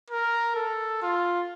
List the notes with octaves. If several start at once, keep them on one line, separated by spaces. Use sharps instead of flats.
A#4
A4
F4